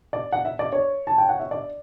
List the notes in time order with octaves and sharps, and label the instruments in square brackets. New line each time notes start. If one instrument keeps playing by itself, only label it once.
[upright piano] D5
F#5
E5
D5
C#5
A5
G5
F#5
E5
D5